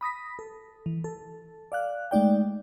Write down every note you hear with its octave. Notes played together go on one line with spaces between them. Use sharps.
B5 D#6 A#6 B6
A4
E3
A4
D5 F5 F#6
G#3 A3 D#4 D5 G5